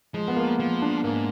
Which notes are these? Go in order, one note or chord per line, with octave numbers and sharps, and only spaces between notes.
F3 G#3
B3
A#3
F3 A#3
D4
G#2 A#3